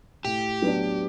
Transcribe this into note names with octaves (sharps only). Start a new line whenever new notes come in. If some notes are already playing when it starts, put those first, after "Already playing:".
A2 G4
F#3 B3 D4